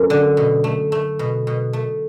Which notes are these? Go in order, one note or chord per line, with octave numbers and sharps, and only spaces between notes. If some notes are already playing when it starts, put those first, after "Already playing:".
Already playing: F#2 A3
D3
B2
A3
A3
B2
B2
A3